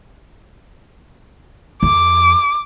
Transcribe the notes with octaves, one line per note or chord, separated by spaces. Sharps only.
F2 D6